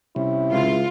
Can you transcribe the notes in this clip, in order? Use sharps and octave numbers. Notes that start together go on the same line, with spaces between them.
C3 G3 C#4 E4
C#2 F4